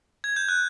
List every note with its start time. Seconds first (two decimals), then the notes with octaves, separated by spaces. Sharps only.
0.24 G#6
0.36 G6
0.48 F#6